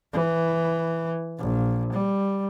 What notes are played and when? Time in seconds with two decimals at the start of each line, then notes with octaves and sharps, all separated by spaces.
0.13 E3
1.39 A#1
1.93 G3